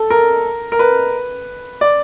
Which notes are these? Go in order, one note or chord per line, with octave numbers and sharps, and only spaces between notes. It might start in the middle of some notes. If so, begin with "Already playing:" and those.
Already playing: A4
A#4
A#4
B4
D5